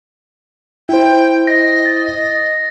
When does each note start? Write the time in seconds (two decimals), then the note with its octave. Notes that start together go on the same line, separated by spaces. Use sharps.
0.89 E4 C5 G5
1.47 D#5 A#6
1.86 A6